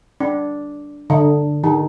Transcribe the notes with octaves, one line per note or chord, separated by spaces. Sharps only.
D4
D3
D#3